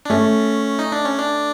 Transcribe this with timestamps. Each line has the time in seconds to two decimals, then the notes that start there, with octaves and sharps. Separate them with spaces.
0.05 D4
0.10 A3 C#4
0.79 D#4
0.92 D4
1.05 C#4
1.19 D4